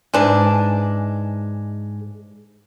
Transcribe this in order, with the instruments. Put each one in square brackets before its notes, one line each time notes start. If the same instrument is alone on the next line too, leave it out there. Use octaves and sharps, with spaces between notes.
[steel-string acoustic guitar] G#2 G#3 [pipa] E3 D4